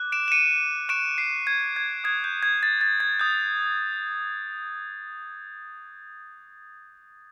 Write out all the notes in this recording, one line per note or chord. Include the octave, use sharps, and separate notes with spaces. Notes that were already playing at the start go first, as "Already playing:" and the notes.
Already playing: D6 F#6
D7 E7
E7
C#7 D#7
C#6 F#6 D7 E7
C7
G#6
G#6
D#6 F#6 G#6
G6
G#6
A6
A6
G#6
D#6 G6